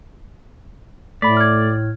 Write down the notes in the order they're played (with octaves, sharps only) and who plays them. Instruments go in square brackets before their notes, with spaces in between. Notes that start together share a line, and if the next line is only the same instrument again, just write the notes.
[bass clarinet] A2 [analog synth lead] A3 [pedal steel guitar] D5 [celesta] B5 B6
[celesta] F6 G#6